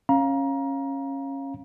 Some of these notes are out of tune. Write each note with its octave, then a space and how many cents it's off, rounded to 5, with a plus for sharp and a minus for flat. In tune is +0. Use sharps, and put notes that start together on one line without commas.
C#4 -20 F5 +0 A#5 +25